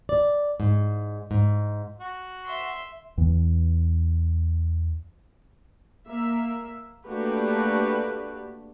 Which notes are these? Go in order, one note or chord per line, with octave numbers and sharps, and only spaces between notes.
D5
G#2
G#2
F#4
E5 C6
E2 E3
A#3 E5
A3 A#3 D4 F#4 G4 B4